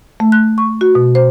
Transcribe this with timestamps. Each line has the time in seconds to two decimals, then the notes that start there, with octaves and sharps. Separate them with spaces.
0.20 A3
0.32 F#6
0.58 C#6
0.81 F#4
0.95 B2
1.15 C5